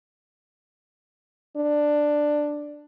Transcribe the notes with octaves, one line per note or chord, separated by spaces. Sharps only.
D4